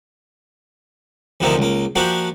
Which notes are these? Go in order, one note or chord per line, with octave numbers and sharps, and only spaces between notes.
D2 C3 D#3 F3 A#3 C4
C#2 A#3
F3 A#3 D4 F#4 G4